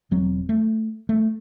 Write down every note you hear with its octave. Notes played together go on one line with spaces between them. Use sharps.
E1 F#3 C4
A3
A3